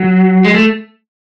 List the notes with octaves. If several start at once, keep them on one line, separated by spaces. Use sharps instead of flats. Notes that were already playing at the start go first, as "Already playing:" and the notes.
Already playing: F#3
G#3
A3